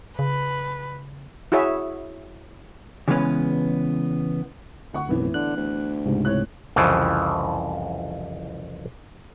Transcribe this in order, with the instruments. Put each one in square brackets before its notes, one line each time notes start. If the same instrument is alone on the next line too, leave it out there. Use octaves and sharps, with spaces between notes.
[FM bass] C#3 [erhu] B4
[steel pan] E4 F#4 G#4 C#5 E5
[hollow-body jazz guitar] C#3 E3 G#3 B3 C#4 B4
[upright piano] D2 F#5 C#6
[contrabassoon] F1 [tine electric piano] B1 F#2 [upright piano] A2 E3 B3
[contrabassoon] D3 [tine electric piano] F#6
[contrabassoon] D2
[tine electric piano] C#2 G#2 C3
[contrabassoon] A2 [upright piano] C4 C#5 F#6
[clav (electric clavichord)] C2 F2 C#3 E3 F3